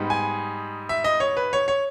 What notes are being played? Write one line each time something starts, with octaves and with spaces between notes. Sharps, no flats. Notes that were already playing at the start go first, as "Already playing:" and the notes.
Already playing: G#2 G3 B3 D#4
G#5
E5
D#5
C#5
B4
C#5
C#5